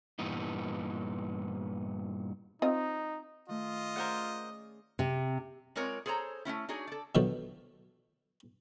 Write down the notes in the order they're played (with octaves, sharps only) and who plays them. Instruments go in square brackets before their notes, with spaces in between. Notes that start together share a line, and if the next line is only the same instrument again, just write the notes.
[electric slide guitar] G2 A#2 E3 B3 D#4
[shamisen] C4 F4 D#5 [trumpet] D#4
[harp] D#3 A3 [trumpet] F4 [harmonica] D#5
[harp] C#4 G#4 D5 [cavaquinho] A#4 C5 F#5
[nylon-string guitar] C3
[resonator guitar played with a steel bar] G#3 C4 F4 A#4 C#5 D5
G#4 A4 C5 C#5 A#5
A3 C4 C#4 E4
D4 D#4 F#4 G#4 C#5
A4 D5
[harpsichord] B2 D3 D#3 F3 F#3 A3